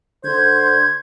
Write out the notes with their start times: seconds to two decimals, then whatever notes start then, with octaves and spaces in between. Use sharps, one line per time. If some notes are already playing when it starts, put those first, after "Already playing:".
0.24 D3 C5 C6 G6 G#6